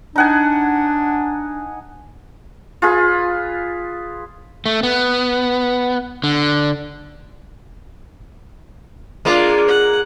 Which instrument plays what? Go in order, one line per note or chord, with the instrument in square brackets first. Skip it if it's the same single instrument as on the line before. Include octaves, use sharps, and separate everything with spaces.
[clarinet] D4 [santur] D#4 F#5 G#5
[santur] F4 G#4 B4
[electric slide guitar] A3
B3
D3
[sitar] G#3 A#3 [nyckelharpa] D4 F4
[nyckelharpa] F#5